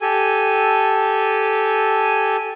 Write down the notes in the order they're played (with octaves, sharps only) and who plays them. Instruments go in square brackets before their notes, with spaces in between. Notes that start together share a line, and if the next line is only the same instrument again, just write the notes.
[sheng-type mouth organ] G4 A4 G#5